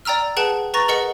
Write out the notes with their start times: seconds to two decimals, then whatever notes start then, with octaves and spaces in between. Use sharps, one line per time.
0.05 D5 G5 A#5 E6 F6
0.37 G#4 B4 F#5 G5 A5
0.74 B4 A#5 C#6 A6 A#6
0.88 G#4 A#4 B4 D#5 F#5 C#7